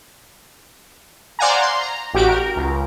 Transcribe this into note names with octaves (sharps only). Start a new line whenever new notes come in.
C5 D5 F5 F#5 G#5 A#5
C6
A#5
A1 F#4 G4 D7
A#4
C#2